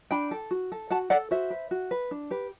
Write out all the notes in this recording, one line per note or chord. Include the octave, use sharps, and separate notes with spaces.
D4 G5 B5
A4
F#4
A4
F#4 F#5 A5
A4 D5 F#5
F#4 C5 E5
B4
F#4
B4
D4
G4 B4